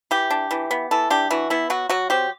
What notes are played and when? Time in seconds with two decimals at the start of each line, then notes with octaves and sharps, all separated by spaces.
0.11 E3 G4
0.30 D4
0.51 E3
0.71 B3
0.91 E3 A4
1.10 D4 G4
1.30 E3 F#4
1.50 B3 E4
1.70 F#3 F#4
1.89 F#3 F#4
2.10 C4 G4